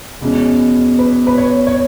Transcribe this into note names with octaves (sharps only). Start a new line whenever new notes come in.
E2 B2 G#3 C#4
B4
B4
C#5
C#5